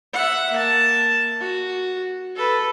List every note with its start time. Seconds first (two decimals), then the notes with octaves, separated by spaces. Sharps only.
0.13 E5 F#5
0.52 A#3 A5
1.40 F#4
2.36 A4 B4